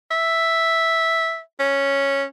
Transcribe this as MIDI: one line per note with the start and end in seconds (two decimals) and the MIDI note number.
0.11 1.40 76
1.59 2.24 61